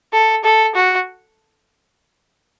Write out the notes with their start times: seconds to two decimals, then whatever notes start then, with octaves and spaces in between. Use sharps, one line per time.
0.13 A4
0.44 A4
0.75 F#4